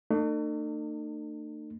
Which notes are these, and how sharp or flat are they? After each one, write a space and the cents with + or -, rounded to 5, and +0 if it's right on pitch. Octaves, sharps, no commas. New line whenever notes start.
A3 +40 D#4 -45